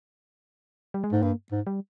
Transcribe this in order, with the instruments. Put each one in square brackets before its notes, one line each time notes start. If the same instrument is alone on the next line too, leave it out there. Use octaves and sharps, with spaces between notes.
[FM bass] G3
G#3
[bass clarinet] G#2 [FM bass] A3
[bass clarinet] G2 [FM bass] A#3
[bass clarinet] G#2
[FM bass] G3